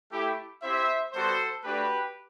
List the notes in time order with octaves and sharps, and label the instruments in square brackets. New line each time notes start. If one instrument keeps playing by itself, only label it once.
[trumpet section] A3 E4 G4
C4 E4 G4 C5 E5
G3 B3 F#4 A4 C5
A3 D4 F#4 G4 B4